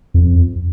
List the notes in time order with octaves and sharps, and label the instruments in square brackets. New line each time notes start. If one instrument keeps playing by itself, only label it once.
[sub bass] F2